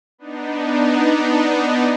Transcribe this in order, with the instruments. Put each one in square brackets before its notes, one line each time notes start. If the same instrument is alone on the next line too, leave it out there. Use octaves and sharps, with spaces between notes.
[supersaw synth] B3 D4 D#4